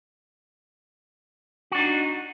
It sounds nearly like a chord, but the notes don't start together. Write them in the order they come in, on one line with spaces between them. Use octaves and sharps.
F#4 D4 D#4